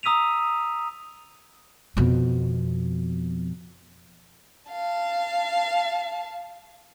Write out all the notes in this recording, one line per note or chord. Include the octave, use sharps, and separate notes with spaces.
A#5 D#6 E6 B6 D#7 F7
F2 B2
F5 A5